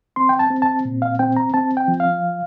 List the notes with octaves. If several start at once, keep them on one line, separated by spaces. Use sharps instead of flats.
C4 C6
G5
A5
C4
A5
A#2
F5
C4 G5
A#5
C4 A5
G5
F3
F5